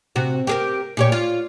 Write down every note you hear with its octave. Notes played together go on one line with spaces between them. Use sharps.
C3 F#4
G4 G#4 A#4
A#2 G4 C#5
F4